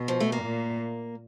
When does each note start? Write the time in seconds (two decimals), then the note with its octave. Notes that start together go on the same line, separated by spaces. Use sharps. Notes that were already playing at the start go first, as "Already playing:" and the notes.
Already playing: B2
0.08 F3
0.20 A3
0.32 A#3
0.43 A#2